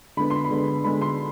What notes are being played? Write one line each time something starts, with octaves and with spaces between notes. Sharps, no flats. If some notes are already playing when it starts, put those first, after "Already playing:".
D3 G#3 B3 B5
C6
B5
D3 G#3 B3
D3 G#3 B3 B5
C6